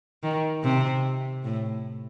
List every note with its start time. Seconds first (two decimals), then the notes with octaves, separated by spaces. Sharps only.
0.24 D#3
0.64 C3
1.44 A2